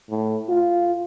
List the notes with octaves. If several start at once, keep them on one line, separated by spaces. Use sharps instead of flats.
A2
F4